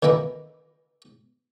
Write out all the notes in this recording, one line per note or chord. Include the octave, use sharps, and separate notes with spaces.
D#3 E3 A#3 E4 D6